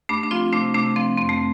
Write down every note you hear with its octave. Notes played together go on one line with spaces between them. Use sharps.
G2 A3 D4
D4
F3 C4 F4
C3 A3 D4
C3 A3 D4
F3 C4
F2 C4
A3